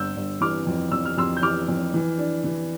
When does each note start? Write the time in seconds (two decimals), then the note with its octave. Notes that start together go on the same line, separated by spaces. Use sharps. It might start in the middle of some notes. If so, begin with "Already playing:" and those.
Already playing: G1 E6 G6
0.16 G1
0.41 E3 D6 F6
0.67 F2
0.92 F2 E6
1.05 F6
1.17 F2 C6 E6
1.37 G6
1.42 E3 D6 F6
1.68 F2
1.94 E3
2.18 D4
2.44 E3